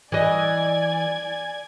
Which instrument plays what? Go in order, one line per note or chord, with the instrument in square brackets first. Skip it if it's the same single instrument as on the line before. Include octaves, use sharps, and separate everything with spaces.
[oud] E3 D#5 [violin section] D5 G#5 G#6